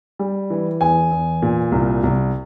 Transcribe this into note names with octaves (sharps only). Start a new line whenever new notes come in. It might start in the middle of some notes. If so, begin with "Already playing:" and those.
G3
E3
E2 G#5
E2
A#2
C2
C2